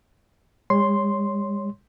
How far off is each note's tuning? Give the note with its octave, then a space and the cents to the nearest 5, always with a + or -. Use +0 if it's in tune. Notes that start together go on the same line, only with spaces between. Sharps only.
G#3 -45 C#5 +0 C6 +0